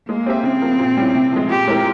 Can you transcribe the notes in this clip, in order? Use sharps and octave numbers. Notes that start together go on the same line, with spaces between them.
G#3 A#3
C4 G4 C5 E5
C#3 C4
F3 A#3
A#2
G3 C#4 E4
C3
F3 G#3
A#2 G4
G#3 C4 E4 A#4